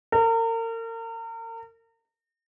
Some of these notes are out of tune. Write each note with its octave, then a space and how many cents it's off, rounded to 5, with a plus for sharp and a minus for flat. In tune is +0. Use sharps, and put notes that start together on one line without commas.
A#4 -35